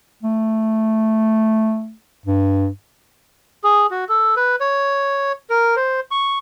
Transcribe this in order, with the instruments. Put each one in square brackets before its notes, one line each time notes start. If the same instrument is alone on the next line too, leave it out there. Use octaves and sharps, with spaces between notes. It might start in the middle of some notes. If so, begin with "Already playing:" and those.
[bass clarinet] A3
G2
[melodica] G#4
F#4
A4
B4
C#5
A#4
C5
C#6